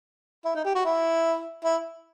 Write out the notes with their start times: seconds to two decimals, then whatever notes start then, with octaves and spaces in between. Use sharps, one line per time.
0.45 E4
0.55 D#4
0.65 G4
0.75 F#4
0.85 E4
1.64 E4